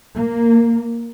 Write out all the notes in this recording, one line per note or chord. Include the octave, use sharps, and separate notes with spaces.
A#3